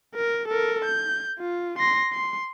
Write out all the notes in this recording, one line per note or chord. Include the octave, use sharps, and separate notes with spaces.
A#4
A4 A#4
G6
F4
C6 A#6
C6